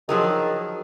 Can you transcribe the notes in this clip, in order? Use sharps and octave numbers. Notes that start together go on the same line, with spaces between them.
D#3 F3 F#3 G#4